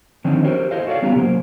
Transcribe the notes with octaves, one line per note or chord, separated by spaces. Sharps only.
D3 D#3 F3 C4 C#4 D#4
F#4 G4 A#4 C5 C#5
E4 A4 C5 D#5 F5
F#4 A4 C#5 D5 F5
G3 B3 C#4 F4 G4 A#5
C3 F#3 A#3 C5